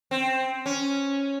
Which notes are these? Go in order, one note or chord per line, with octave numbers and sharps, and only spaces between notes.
C4
C#4